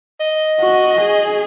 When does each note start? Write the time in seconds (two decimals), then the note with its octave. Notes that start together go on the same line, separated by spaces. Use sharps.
0.20 D#5
0.60 F#4
1.01 G#4